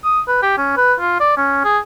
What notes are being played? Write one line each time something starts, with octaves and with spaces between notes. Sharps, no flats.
D#6
B4
G4
C#4
B4
F4
D5
C#4
G#4